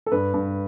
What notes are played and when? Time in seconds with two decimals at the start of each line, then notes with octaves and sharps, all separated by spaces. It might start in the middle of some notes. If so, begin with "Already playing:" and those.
0.06 A4
0.12 G2 B4
0.34 G2